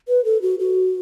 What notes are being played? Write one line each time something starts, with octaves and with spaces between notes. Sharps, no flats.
B4
A4
F#4
F#4